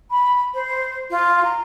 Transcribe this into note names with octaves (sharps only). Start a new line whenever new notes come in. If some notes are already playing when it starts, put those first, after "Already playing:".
B5
C5
F4
A#5